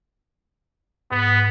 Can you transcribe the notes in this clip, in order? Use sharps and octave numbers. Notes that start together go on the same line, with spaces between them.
G#2 B3